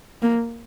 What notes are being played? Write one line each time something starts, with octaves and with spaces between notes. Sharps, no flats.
A#3